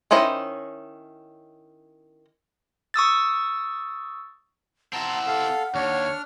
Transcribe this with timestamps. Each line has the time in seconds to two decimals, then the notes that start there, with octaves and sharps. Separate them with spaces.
0.11 D#3 C#4 E4 C5 D#5
2.94 C#6 D#6 E6 A6
4.93 C4 E4 F#5 A5 A#5 C6
5.27 A4 F5
5.75 D#2 D4 C#5 F6